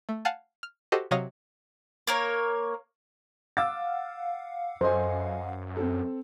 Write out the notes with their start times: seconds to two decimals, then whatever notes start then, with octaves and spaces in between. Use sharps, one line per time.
0.09 A3
0.25 F5 F#5 G#5 A5
0.63 F6
0.92 F#4 G4 A4 C5 D#5
1.11 C3 F#3 C#5 D#5 F5 A#6
2.07 A#3 A#4 C#5
3.57 F5 F#5 D6 E6 A6
4.81 F#2 A4 C5 D#5 G#5
5.77 C4 A4